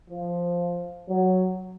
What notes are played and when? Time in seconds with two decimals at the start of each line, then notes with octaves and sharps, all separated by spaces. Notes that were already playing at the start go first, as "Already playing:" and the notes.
0.10 F3
1.09 F#3